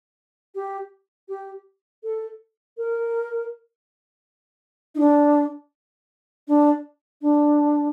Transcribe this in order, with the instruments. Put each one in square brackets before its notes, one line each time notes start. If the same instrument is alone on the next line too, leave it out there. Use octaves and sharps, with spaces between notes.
[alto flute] G4
G4
A4
A#4
D#4
D4
D4
D4